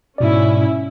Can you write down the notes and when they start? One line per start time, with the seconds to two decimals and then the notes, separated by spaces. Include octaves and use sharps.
0.18 G#2 B2 C#4 E4 D5